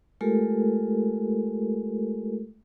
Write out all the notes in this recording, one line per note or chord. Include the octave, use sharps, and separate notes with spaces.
G#3 A3 F4 G4 A4 A#4